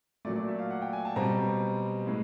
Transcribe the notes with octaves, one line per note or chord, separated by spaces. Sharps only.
A#2 F#3 A3 D5
D5
E5
F5
F#5
G5
G#5
A5
B2 G3 C4 A#5
A2 G#3